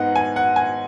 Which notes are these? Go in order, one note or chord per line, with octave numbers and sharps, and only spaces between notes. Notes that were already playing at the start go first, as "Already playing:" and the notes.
Already playing: G#2 B3 D#4 F#5
G#5
F#5
G#5